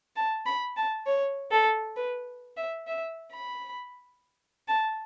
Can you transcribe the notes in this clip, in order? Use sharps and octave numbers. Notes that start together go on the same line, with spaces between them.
A5
B5
A5
C#5
A4
B4
E5
E5
B5
A5